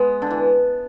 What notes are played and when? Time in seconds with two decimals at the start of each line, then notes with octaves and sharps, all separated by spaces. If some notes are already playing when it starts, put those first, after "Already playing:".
Already playing: G#3 B3
0.22 D3
0.30 E3